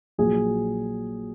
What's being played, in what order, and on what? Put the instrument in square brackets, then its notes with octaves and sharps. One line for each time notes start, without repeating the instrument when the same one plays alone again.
[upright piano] A#1 A#2 F#3 G#4